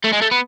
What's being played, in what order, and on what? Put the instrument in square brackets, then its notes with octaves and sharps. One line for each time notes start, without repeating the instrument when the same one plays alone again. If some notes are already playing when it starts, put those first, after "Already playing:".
[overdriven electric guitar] A3
G#3
A3
B3